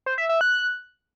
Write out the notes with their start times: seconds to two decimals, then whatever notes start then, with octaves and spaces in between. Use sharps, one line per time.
0.06 C5
0.18 E5
0.29 E5
0.41 F#6